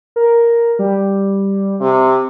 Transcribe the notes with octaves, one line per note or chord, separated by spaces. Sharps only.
A#4
G3
C3